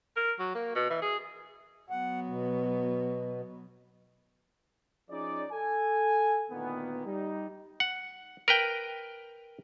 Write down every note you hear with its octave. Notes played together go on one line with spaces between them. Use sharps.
A#4
F#3
A#3
B2
E3
G#4
F#3 B3 F#5
B2
F3 C#4 D#4 G#4 D5
A4 G#5
D2 A#2 D#3 A#3 B3
G3 D#4
F#5
A#4 B4 G5